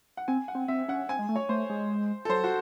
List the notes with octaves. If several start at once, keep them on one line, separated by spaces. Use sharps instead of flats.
F#5
C4 G#5
F#5
C4
C4 E5
C#4 F#5
C4 G#5
G#3
A3
C#5
A3 C5
G#3
A4
F#3 C5
F#4